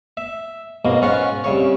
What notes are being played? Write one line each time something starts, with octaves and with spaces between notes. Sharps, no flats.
E5
B1 G#2 B2 A#3
G#2 C#4 F4 C#5 F#5
C2 C#3 C#5